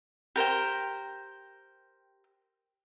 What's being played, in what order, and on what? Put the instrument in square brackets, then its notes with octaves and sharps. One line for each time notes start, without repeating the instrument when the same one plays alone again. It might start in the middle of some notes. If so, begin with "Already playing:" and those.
[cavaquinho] G4 A#4 C5 G5